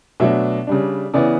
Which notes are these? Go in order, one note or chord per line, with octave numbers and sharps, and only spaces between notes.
B2 F#3 A3 D4 E5
C#3 G3 D4
C#3 E3 B3 E4 D5